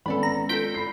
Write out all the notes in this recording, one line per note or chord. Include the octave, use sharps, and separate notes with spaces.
G#1 B3 C#4 A4 D5 B5
A#5
F4 A4 G6 B6 D7
B5 C7